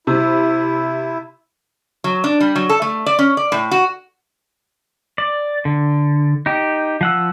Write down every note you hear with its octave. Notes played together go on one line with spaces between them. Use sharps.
C3 E4
F#3
D4
G3
F#3
A4
A3
D5
C#4
D5
A2
F#4
D5
D3
D#4 G4
F3 F#5 E6